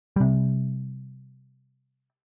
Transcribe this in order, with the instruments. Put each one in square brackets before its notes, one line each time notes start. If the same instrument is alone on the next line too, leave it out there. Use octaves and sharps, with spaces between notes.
[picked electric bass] C3 G3